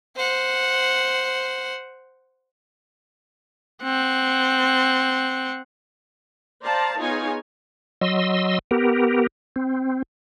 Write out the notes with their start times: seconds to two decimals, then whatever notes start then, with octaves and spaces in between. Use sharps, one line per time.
0.16 C5 F#5
3.83 C4 F#5
6.64 C5 D5 F5 A5 A#5
6.99 B3 D#4 F4 G#4 C#5 G#5
8.01 F#3 D#5 C6 E6
8.71 B3 G4 A#4
9.56 C4